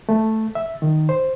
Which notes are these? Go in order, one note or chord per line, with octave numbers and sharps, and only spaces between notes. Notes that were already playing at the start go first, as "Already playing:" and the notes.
A3
E5
D#3
C5